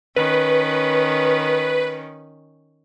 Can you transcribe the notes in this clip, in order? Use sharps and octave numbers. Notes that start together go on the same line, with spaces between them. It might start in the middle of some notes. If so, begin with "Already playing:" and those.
D#3 C#4 B4